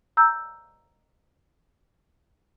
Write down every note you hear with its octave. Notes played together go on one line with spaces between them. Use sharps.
A#5 E6 G6